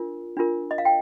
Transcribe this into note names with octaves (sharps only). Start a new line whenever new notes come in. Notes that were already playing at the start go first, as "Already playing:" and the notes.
Already playing: D4 F4 A#4
D4 F4 A#4
D#5
F5
G5